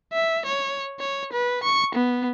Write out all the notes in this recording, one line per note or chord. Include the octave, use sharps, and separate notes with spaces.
E5
C#5
C#5
B4
C#6
B3